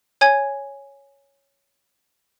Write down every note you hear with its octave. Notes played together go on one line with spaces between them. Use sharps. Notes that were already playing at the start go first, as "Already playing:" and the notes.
C#5 G#5 G#6